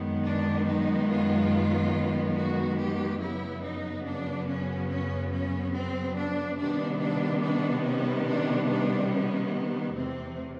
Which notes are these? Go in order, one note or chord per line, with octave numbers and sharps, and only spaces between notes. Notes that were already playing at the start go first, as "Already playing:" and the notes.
Already playing: F#2 D#3 G#3 B3
D4
D#4
F4
F#4
G4
F#2 C#3 F#3 B3 E4
D#4
D4
C#4
C#4
C#4
C4
D4
C3 D#3 G3 B3 D4
D4
D4
C#4
D4
D4
C#4
E2 C3 E3 A3 C4